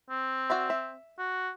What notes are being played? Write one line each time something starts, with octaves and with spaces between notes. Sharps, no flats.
C4
F#4 D5 E5
E5
F#4